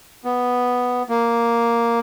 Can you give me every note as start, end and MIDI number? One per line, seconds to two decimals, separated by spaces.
0.24 1.03 59
1.09 1.99 58